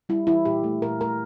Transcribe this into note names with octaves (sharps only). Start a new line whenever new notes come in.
G3 E4
E3 E4
A#2 G4
A3
A#2 A#4
A3 A#4